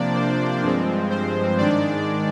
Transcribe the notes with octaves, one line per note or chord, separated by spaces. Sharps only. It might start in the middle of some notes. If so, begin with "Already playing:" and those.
Already playing: C3 F3 A#3 D4 D5
C5
G2 F3 G#3 C4
C5
G#2 D#3 G#3 D4 D5